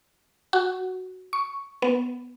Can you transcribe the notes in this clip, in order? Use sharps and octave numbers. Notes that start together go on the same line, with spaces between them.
F#4
C#6
B3